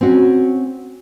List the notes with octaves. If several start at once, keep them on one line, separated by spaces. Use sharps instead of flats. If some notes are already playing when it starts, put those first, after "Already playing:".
C4 C#4 F#4